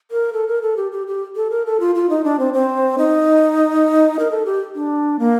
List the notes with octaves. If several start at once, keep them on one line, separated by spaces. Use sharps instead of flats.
A#4
A4
A#4
A4
G4
G4
G4
A4
A#4
A4
F4
F4
D#4
D4
C4
C4
D#4
A#4
A4
G4
D4
A#3